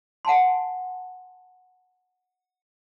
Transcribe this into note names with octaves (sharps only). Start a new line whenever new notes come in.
F#5 G#5 A5 C6